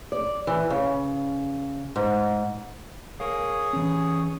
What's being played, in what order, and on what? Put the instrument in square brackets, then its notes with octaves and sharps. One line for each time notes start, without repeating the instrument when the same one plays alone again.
[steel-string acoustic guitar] D5
E3
C#3
G#2
[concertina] G#4 C#5 D#6 [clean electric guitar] A#4 F5
[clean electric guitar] E3 C#4